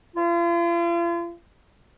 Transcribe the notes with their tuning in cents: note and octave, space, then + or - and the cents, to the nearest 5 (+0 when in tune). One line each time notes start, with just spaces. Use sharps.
F4 -40